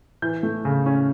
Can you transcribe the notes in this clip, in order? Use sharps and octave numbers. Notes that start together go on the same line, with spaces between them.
E3 G6
A3
C#3
C#4